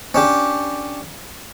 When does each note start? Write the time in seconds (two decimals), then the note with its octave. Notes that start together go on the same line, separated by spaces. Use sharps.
0.14 C#4 D4 G4